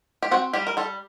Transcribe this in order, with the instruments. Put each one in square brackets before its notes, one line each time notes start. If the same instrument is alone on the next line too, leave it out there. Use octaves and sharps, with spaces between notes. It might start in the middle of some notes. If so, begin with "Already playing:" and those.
[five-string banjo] G4
C4 F#4
G3 G4
A#4
G3 A4